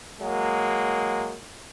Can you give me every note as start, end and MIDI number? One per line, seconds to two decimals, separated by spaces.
0.20 1.35 54
0.20 1.35 56
0.20 1.35 58